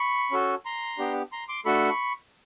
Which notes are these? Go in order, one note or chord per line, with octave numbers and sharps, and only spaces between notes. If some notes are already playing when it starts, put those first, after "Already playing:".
Already playing: B5 C#6
C#4 F#4 A4
A#5 C6
B3 D4 G4
A#5 C6
C6 D6
A3 D4 F#4 A4 B5 C#6